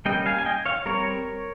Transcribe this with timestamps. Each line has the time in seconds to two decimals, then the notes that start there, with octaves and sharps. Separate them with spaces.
0.05 G3 A#3 C#4 D#5 G5
0.26 F5 G#5
0.38 G#5
0.46 D#5 G5
0.66 C#5 F5
0.86 G3 C4 A#4 C#5